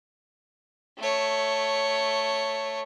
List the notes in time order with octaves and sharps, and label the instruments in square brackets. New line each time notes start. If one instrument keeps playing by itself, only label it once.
[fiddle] A3 C#5